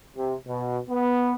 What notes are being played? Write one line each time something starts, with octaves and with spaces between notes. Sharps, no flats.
C3
B2
B3